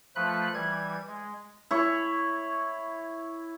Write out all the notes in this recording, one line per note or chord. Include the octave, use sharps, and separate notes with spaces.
F3 A3 F4 B4 B5 F#6
E3 G3 G#6
G#3
E4 C#5